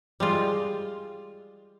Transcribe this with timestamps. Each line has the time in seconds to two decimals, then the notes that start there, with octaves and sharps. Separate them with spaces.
0.20 G3 G#3 F4